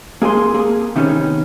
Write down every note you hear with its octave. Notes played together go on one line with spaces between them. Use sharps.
A#3 G#4 G#5 C6
A#3 G#4
C3 D#3 B3 C#4